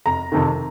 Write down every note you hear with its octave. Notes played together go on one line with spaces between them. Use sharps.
F1 A#5
F2 C3 D#3